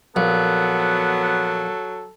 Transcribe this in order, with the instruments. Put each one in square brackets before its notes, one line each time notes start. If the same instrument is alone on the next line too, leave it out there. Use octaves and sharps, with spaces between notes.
[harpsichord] A#1 [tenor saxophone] F#3 [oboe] B3 [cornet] A4